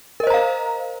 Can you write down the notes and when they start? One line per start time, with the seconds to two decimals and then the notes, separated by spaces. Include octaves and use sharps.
0.20 A#4
0.23 D#5
0.27 C5
0.30 A#5
0.34 F5